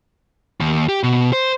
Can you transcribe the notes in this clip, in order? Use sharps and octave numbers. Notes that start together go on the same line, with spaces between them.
D#2
G4
B2
C5